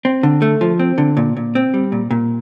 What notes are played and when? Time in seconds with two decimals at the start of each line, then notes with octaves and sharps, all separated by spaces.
0.05 C4
0.23 D3
0.42 A3
0.61 F3
0.79 C4
0.98 D3
1.17 A#2
1.37 A#2
1.55 C4
1.74 G3
1.92 A#2
2.11 A#2